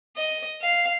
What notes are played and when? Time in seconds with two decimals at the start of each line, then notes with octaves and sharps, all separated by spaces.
0.17 D#5
0.62 F5